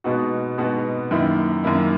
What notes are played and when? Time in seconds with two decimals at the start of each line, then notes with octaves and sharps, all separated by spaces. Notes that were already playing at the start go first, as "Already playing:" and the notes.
0.04 B2 G#3 B3 D#4 F#4
0.58 B2 G#3 B3 D#4 F#4
1.11 F#2 D#3 A#3 E4
1.64 F#2 D#3 A#3 E4